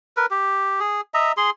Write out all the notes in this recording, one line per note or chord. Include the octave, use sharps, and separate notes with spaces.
A#4 B4
G4
G#4
D#5 E5 A#5
G#4 C6